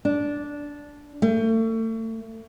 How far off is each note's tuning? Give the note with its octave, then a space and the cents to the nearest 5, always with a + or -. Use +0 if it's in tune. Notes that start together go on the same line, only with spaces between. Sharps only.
D4 -10
A3 +35